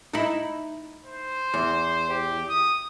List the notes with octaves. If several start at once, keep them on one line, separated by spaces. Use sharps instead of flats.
D#4 E4
C5
E2
G4
D#6